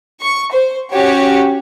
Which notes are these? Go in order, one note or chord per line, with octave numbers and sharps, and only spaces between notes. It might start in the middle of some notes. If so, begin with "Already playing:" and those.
C#6
C5
C#4 F#4 G4 C#5